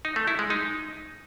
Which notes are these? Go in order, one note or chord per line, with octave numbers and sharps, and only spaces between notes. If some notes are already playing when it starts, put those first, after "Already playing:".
D#4
A3
E4
G#3
D#4